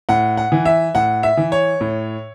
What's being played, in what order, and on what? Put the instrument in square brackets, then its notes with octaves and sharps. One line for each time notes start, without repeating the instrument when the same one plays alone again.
[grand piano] A2 F#5
F#5
E3
E5
A2 F#5
E5
E3
C#5
A2